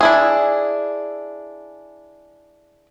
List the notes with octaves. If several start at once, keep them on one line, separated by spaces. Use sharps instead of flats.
D4 E4 G#4